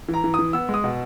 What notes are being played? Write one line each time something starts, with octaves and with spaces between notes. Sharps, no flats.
E3
A#5
E3
D#6
E3
B3 E6
G#3
D#6
B2